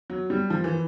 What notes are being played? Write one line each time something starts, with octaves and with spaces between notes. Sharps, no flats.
F#3
G3
F3
E3